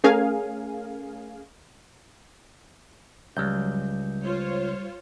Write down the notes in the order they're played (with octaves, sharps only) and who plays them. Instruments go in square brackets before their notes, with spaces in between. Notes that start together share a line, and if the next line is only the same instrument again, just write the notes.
[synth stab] A3 C#4 G#4 A#4 F5 G#5
[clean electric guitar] C#2 [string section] F#3 [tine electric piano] G3 G6
[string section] F4 C5 C#5